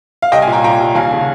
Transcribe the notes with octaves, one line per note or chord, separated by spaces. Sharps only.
F5
C2 D#5 G5
F5 G#5
A#2
G5 A#5
A#2 G5 A#5
C2
D#2 F5 G#5
C#3